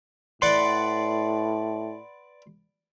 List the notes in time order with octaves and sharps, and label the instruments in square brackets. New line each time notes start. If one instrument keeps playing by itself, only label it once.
[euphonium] A2 [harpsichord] B4 D5 F#5 [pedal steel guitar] C6